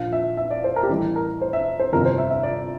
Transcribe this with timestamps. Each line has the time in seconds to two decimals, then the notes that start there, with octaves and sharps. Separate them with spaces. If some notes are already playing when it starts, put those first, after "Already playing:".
Already playing: A#1 A#2 F3 F5
0.13 E5
0.37 E5
0.51 D5
0.64 C5
0.76 A#4
0.83 G4
0.89 A1 A2 E3 G3 A4
1.16 A#4
1.42 C5
1.53 E5
1.80 C5
1.92 G1 F2 C3 G3 C4 A#4
2.05 C5
2.18 E5
2.30 E5
2.43 D5